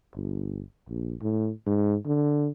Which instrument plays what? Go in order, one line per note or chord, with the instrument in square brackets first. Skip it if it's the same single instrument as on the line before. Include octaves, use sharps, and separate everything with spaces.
[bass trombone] G1
A#1
A2
G#2
D3